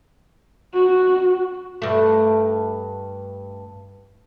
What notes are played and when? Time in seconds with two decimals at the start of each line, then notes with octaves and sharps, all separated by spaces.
0.74 F#4
1.82 G2 A3